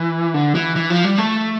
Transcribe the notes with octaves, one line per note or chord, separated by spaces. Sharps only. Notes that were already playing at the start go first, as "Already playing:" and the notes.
Already playing: E3
D3
E3
E3
F3
G3
A3